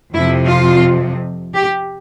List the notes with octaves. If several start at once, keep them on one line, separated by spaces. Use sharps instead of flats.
F2 C3 F3 E4
F4
G4